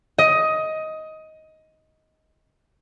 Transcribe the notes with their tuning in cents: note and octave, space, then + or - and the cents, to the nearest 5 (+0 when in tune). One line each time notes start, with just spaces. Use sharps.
D#5 +15